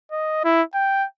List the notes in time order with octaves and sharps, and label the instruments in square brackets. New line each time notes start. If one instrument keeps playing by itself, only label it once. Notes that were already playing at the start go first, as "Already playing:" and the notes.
[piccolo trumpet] D#5
E4
G5